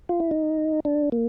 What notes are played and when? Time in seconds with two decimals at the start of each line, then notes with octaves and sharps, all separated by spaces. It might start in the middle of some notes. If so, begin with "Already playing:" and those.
0.09 F4
0.20 E4
0.31 D#4
0.85 D4
1.12 A#3